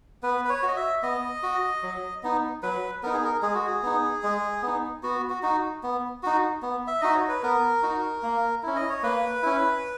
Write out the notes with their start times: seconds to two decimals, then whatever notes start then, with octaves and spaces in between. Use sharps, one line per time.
0.23 B3 B4
0.45 B4
0.50 C#5
0.63 F#4
0.68 D#5
0.76 E5
1.03 B3 D#5
1.43 F#4
1.83 F#3
2.23 B3 D#4
2.63 F#3 B4
3.03 B3 D#4 A#4
3.13 G#4
3.24 A#4
3.42 G#3 G#4
3.55 F#4
3.67 G#4
3.83 B3 D#4
4.23 G#3
4.63 B3 D#4
5.03 B3 F#4
5.30 F#4
5.43 D#4 F#4
5.83 B3
6.23 D#4 F#4
6.62 B3
6.87 E5
7.01 D#4 F#4 D#5
7.15 C#5
7.28 B4
7.43 B3 A#4
7.83 D#4 F#4
8.23 A#3
8.63 C#4 E4
8.76 D#5
8.89 C#5
9.03 A#3 B4
9.43 C#4 E4